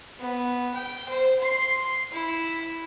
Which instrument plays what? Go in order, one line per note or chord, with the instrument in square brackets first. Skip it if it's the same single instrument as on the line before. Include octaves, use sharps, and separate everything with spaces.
[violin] B3
G5
C5
C6 C7
E4